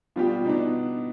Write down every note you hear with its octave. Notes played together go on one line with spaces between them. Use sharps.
B2 G3 D4 F4 G4
B2 B3 D4 D#4